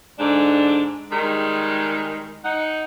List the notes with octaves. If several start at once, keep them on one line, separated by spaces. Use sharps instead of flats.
G#2 D3 D4
D#3 G3 G#3
D#4 F#5